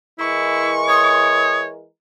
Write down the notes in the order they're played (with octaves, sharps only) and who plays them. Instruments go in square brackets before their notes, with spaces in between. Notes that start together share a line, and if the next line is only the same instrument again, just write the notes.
[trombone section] E3 G#3 A#4 [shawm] E4 [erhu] C#6
[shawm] C#5 [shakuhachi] D#6